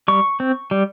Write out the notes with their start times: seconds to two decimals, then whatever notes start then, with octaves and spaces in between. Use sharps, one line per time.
0.08 G3 C#6
0.40 C4
0.71 G3